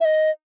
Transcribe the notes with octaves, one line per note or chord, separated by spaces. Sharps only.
E5
D#5